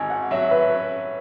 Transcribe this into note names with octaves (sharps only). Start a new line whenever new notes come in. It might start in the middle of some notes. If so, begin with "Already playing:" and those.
Already playing: G#1 G#2 G#5
F#5
F#3 E5
B4
C#4